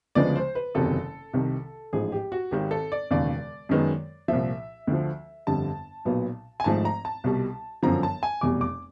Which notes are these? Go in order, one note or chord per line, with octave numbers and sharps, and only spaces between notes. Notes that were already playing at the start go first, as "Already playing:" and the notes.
D2 C#3 F3 G#3 B3 D5
C5
B4
F#1 E2 C3 D#3 F#3 A4
C2 C3 D#3
A1 G#2 F3 G#4
G4
F#4
G#1 G#2 D#3 G4
A4
D5
E1 D#2 C#3 D5
F#2 D#3 G#3 B3
C2 A#2 F3 E5
D2 D3 F3
G1 F2 D3 G3 A5
B1 A#2 F#3 B3
G#5
G#1 G#2 F3 A3 A5
A#5
A5
C2 B2 G3
G1 F#2 D3 F3 A#5
A5
G#5
F1 E2 B2 G3 D6
D6